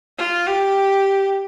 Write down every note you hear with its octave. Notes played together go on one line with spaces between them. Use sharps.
F4
G4